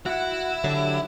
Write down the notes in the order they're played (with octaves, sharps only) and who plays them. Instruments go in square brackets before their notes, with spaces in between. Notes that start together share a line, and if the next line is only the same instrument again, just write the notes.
[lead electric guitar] E4 [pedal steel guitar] F#4 F#5
[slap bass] D3 [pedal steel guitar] F#3 D4 G4